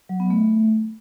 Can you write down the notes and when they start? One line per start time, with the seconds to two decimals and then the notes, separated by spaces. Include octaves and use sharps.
0.09 F#3
0.20 B3
0.30 A3